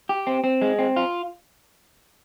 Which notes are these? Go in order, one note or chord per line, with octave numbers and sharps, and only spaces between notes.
G4
C4
C4
G#3
C4
F4